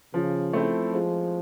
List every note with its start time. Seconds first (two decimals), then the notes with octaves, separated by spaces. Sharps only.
0.14 C#3 F3
0.53 A3 C4 E4
0.93 F3 G#3